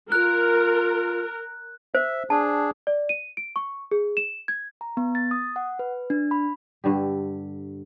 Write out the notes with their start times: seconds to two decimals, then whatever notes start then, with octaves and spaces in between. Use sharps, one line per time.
0.12 F4 A#4 F#6
1.95 C5 E5
2.30 D4 G#4 A5
2.87 D5
3.09 D#7
3.37 D7
3.56 C#6
3.91 G#4
4.17 E7
4.48 G#6
4.81 A#5
4.97 B3
5.15 A6
5.31 D#6
5.56 F#5
5.79 B4
6.10 D4
6.31 B5
6.84 G2 D3 G4